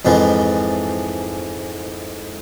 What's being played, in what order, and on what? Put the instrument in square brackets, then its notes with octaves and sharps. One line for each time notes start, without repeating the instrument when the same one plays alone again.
[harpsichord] F2 G#2 E3 F3